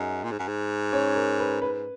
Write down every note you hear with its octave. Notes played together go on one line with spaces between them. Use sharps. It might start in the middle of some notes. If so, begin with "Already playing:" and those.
Already playing: F#2 D#4 G#4
A#2
G#2
F#2
G#2
C#4 C#5
A#4
B4
G#2 B4